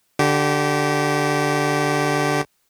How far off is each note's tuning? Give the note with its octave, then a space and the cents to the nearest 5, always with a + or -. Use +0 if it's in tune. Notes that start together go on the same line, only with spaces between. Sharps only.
D3 +0 G4 -25